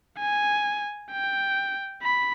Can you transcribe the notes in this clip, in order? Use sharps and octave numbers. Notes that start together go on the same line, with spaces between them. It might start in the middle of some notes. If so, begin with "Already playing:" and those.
G#5
G5
B5